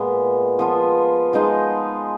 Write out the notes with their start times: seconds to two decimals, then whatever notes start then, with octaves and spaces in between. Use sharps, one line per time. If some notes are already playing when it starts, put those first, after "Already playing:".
Already playing: A#2 G#3 B3
0.59 F3 B3 F4
1.33 F3 G#3 D#4